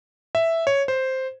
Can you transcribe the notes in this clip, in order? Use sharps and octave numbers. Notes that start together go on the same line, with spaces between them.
E5
C#5
C5